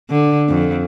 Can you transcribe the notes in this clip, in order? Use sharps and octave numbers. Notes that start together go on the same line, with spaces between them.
D3
F2